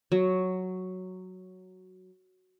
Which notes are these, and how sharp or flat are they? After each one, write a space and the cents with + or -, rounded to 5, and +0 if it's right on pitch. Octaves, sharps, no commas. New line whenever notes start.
F#3 +0